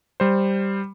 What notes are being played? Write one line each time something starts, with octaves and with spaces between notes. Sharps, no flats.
G3 C5